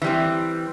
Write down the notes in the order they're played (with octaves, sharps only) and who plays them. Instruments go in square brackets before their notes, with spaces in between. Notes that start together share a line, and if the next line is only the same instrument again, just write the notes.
[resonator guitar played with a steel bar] E3 G3 C4